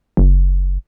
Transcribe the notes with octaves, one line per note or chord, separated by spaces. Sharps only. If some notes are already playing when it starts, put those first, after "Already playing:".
F#1